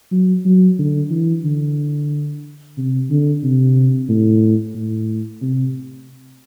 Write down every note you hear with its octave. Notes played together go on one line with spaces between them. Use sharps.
F#3
F#3
D3
E3
D3
C3
D3
C3
A2
A2
C3